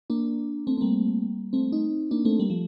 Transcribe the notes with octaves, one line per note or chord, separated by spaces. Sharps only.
A#3 D4
A3 C4
C4
G3 A#3
A3 C4
C4 D#4
A#3 D4
A3 C4
G3 A#3
F3 A3